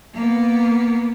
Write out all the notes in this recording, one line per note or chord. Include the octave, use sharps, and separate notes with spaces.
A#3 B3